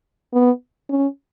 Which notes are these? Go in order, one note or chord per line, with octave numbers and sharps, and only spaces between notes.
B3
C#4